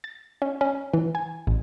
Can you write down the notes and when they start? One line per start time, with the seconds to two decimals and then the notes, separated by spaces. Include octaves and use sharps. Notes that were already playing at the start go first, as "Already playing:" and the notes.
0.04 A6
0.42 C#4
0.61 C#4
0.93 E3
1.15 G#5
1.47 A1